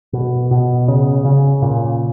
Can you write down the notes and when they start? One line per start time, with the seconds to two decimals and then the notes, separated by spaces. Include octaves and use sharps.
0.13 B2
0.51 B2
0.88 C#3
1.25 C#3
1.62 A#2